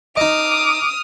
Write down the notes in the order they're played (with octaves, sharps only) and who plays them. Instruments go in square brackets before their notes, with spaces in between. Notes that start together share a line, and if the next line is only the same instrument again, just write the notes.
[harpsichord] D#4 D#5 [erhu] D6 [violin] D#6 F6